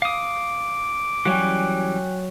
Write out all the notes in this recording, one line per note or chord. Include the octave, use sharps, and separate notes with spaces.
F5 D6 D#6
E3 F#3 G3 C#4 G5 G#5 F#6